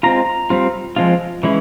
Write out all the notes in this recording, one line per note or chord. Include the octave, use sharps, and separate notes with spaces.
G#3 C4 F4 A#5
G3 C4 F4
F3 G#3 C4 F4
E3 G#3 C#4 E4